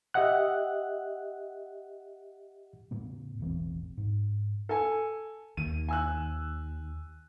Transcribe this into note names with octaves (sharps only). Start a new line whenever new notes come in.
G4 D#5 E5 F#5 F#6
A2 C#3 B3
E1 A1 E3 C4
G#2
A4 G#5
D#2 D#7
G#5 E6 F#6